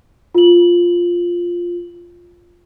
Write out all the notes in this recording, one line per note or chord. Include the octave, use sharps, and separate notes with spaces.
F4 F#7